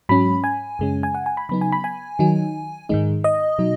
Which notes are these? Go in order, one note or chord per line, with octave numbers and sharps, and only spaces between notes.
G#2 F#3 C#4 B5
G#5
F#2 C#3 G#3 C#4
G#5
F#5
G#5
B5
C#3 F#3 B3 D#4 B5
G#5
B5
G#5
D#3 F#3 D#4
G#2 D#3 G#3 D#4
D#5
B2 F#3 D#4